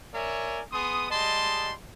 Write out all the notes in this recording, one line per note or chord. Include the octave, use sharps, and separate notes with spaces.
A#4 C#5 D5 E5 G#5
B3 G#4 C6 D#6
G3 G#3 D#5 A5 C6